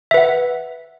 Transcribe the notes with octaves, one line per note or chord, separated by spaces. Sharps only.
B4 E5 F#5